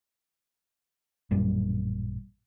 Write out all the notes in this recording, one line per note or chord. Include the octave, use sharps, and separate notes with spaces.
A1 F#2 A#2 G3